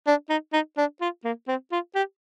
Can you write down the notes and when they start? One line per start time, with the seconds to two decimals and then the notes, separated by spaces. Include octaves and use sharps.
0.07 D4
0.29 D#4
0.53 D#4
0.77 D4
1.01 F4
1.24 A#3
1.48 C4
1.72 F4
1.95 G4